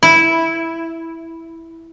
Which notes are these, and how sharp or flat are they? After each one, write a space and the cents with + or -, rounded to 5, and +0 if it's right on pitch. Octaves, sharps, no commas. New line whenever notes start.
E4 -5